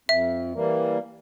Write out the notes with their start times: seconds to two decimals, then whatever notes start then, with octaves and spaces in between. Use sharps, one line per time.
0.09 F2 E5
0.54 E3 G3 A#3